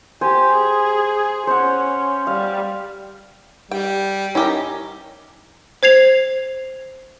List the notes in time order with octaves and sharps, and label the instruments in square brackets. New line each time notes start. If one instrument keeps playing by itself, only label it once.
[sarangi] G4 [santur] C5 G#5
[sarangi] G#4
[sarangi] C#4 [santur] C5 F#5
[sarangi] G3 [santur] F5
[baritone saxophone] G3 [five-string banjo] G5
[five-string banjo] C#4 G4 A#4 [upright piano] D#4 E4
[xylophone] C5 G#6 C7 F7